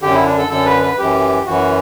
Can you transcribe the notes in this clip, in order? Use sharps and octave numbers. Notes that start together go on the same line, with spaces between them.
F#2 D3 G4
E4
D4
A4
F#2 D3 A4
B4
B4
F#2 E3 G4
F#2 E3 F#4